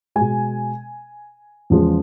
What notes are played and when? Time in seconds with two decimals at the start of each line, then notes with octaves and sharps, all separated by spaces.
0.16 B2 G#3 G#5
1.70 E2 C#3 F3 G#3